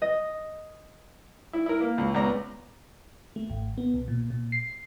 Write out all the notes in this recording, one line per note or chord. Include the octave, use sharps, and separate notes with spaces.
D#5
E4
E4 A#4
A#3
C#2
C#2 B3 D5 A#5
A3
G#1
B3
B1
A#2
A#2
C7